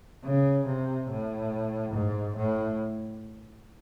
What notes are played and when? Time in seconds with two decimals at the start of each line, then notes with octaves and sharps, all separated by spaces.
0.24 C#3
0.67 C3
1.09 A2
1.94 G#2
2.36 A2